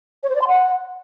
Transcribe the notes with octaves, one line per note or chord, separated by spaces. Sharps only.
C#5
C5
D5
C6
F#5